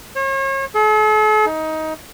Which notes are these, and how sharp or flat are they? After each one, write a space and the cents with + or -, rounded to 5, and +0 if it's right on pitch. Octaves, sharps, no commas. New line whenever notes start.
C#5 -40
A4 -45
D#4 +20